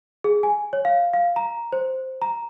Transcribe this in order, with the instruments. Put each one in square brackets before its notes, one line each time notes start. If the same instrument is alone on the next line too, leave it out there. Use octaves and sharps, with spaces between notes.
[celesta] G#4
G#5
C#5
F5
F5
A#5
C5
A#5